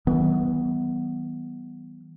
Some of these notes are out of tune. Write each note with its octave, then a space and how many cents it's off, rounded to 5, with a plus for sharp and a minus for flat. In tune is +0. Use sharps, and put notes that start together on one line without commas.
E3 -35 G3 -45 B3 +0